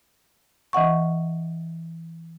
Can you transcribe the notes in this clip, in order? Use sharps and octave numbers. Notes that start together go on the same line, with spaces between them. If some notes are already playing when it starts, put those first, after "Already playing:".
E3 D#5 F#5 C#6